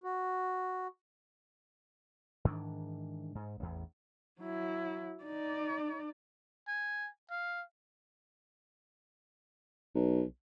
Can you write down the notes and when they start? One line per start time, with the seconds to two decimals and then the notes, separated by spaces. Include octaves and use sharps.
0.04 F#4
2.45 G#2 D#3 E3 D4
3.35 G#2
3.60 A1 E2
4.40 F#3 E4
5.24 D#4 D5
6.68 G#5
7.31 F5
9.95 B1